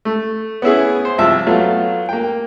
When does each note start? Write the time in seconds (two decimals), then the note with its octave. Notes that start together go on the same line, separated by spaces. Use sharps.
0.05 A3
0.62 B3 C#4 E4 G#4
1.05 C5
1.18 C2 F3 E5 A5
1.46 F#3 A3 B3 F4
2.09 A#3 G5